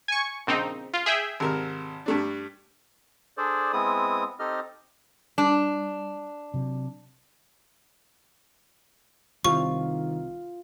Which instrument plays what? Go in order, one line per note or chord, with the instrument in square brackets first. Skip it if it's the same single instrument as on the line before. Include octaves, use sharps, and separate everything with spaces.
[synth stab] G#5 C#6
[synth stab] A#1 C4 D#4 [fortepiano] C#3
[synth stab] F4
G#4 E5 G5
[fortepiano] G#1 C3 A#4
G2 A3 D4
[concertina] D4 G#4 A4 C5 D5
G#3 B3 C4 E4 D#6
C4 D#4 G4 A4 D#5 F6
[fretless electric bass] G3 [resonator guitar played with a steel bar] D4
[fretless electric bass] C3 F#3
[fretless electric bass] C2 C3 [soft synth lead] D#3 [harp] F4 [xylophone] C#6